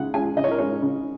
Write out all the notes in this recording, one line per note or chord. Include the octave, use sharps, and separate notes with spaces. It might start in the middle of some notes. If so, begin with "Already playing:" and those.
Already playing: C#3 G#3 F#5
G#3 C#4 G#5
C#3 D#5
C#5
A#4
G#3 C#4 C#5
C#3